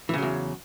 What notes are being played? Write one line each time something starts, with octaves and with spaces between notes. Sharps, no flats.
E2 C#3 E3 F#3